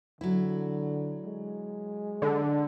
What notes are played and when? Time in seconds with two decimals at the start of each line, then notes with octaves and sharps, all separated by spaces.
0.21 D3 F#3 E4
1.25 G#3
2.22 D3